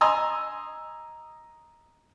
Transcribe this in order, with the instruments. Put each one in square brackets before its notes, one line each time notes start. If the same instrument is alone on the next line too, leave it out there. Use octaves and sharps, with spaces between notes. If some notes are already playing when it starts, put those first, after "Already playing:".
[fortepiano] D#5 G#5 A#5 C6 D#6 E6